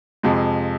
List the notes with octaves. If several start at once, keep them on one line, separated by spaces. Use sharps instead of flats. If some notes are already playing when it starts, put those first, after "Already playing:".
F2 C3 F3 G#3